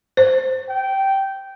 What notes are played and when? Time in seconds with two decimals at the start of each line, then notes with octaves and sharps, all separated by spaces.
0.17 C5
0.69 G5